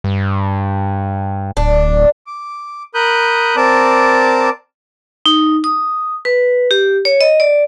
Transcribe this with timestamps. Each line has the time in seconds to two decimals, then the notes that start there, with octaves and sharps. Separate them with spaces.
0.04 G2
1.57 D1 D4
2.27 D6
2.94 A#4 B5 D#6 F#6 G6
3.56 C4 A#4 D5 A5 D6
5.26 D#4
5.64 D#6
6.25 B4
6.71 G4
7.05 C#5
7.21 D#5
7.40 D5